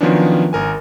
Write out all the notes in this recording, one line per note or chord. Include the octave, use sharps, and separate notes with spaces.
D#3 F3 F#3 B3 C#4 D4
G#1 A#4 G#5